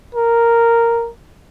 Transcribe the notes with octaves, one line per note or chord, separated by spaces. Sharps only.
A#4